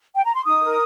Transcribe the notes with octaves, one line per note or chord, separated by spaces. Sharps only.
G5
A#5
C6
D#4 D#6
A#4